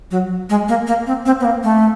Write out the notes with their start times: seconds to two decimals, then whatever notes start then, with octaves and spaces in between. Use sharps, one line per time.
0.11 F#3
0.49 G#3
0.69 A#3
0.87 A#3
1.07 C4
1.26 C4
1.40 B3
1.45 A#3
1.63 A3